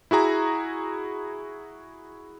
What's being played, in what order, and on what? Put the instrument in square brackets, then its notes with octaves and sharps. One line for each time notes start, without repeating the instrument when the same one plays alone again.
[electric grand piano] E4 F#4 G#4 A#5